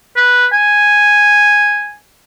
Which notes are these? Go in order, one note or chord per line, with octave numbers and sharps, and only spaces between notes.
B4
G#5